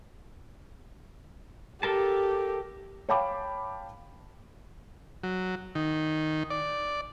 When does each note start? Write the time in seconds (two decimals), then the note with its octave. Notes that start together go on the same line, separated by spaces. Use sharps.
1.83 G4 A4 A#4 A5
3.09 C#5 F5 G5 A5 B5 D6
5.24 F#3
5.75 D#3
6.50 D5